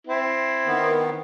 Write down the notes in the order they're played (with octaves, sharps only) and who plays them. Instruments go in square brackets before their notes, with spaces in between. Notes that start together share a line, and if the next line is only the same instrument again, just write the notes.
[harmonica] C4 E4
[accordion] D#3 B3